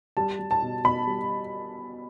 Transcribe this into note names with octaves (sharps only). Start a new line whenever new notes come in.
G3 A5
G3
A5
B2
B2 B5
G3